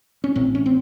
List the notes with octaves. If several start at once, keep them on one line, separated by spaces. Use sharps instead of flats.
C#4
A1 A2 C4
C#4
C4